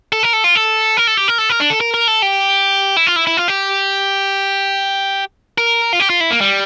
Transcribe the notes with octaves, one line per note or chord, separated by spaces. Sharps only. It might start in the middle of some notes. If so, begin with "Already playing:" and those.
A4
A#4
A4
F4
A4
A#4
A4
G4
A#4
A4
A#4
D4
A4
A#4
A#4
A4
G4
E4
F4
E4
E4
F4
G4
A#4
F4
G4
F4
E4
A#3
G3